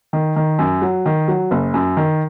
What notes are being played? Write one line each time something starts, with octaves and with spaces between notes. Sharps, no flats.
D#3
D#3
F#2
F#3
D#3
F#3
F#1
F#2
D#3